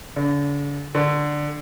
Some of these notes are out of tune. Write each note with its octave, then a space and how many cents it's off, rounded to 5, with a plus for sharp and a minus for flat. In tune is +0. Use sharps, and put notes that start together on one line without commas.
D3 -40
D3 +5